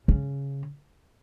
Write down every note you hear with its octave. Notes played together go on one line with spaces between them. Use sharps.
C#3